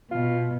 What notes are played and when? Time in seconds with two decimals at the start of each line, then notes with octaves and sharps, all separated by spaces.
0.11 B2 F4